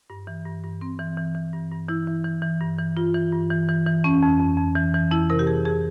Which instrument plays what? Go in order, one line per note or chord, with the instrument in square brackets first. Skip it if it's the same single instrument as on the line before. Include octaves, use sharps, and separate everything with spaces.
[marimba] G2
E3
G2
G2
G2 C4
E3
E3
E3
G2
G2
E3 E4
E3
E3
E3
G2
E3
G2 F4
E3
G2
E3
E3
E3
F2 C#4
F2
F2
F2
E3
E3
F2 E4
C3 A#4
G4
F2 G#4
F2 G#4